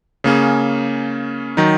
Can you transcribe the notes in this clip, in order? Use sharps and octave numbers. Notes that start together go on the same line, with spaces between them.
C#3 A#3 C#4 G#4
D#3 F#3 D#4